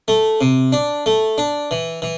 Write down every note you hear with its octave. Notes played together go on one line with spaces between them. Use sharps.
A3
C3
D4
A3
D4
E3
E3